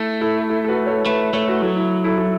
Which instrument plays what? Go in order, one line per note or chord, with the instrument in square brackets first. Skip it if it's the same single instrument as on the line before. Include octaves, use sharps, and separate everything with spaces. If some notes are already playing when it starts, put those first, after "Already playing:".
Already playing: [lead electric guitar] A3 [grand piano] E4
[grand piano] E4 A4
E4 A4
A4
F#4 B4
A4 C#5
[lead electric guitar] A3 [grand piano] B4 E5
[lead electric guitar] A3 [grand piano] A4 C#5
[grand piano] F#4 B4
[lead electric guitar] F#3 [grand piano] E4 A4
[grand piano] E4
E4 A4
E4 A4